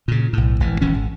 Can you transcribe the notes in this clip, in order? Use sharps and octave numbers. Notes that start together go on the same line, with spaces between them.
A#2 C#3
B1 A2
G#1 E3
D#1 E3 C#4
G#1